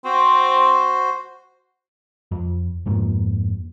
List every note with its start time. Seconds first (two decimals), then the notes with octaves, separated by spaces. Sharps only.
0.05 C4 F#4 C5
2.31 F2
2.86 F2 G#2 F3 A#3